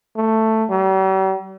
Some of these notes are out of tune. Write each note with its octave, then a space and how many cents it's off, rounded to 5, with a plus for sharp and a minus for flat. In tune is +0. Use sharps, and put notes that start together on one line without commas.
A3 +10
G3 -45